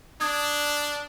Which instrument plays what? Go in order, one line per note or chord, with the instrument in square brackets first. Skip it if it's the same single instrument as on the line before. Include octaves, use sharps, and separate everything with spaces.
[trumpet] D4 [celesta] D#6 G#6